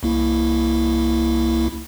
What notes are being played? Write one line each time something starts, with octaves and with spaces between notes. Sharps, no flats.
C2 A#3 E4